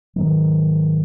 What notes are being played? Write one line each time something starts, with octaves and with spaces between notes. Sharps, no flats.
G#2 D#3 F#3